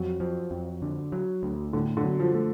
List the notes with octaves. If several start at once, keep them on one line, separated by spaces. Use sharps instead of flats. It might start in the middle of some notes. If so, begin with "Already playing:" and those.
Already playing: F2 F#3
F3
F2
D3
F#3
D2
A2 D3
D3
F#3
F3
A3